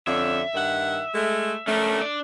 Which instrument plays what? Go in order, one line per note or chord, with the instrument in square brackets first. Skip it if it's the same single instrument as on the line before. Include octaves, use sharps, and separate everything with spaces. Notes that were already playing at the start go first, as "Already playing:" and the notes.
[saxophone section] F2 D3 C#4 [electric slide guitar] E5
[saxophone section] G2 D#3 F#5
G#3 A3
[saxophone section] A3 [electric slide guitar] C#4 D4 A#4
[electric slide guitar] D4 D5